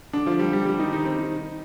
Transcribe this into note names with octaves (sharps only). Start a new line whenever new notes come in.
D3 D4
F3 F4
G3 G4
G3 G4
G3 G4
D#3 D#4
D#3 D#4
C4
D#3 D#4